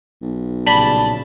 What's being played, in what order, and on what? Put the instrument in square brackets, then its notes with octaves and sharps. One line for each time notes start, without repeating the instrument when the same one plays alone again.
[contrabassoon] B1
[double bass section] A#1 C#3 [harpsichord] G3 B5 [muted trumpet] A5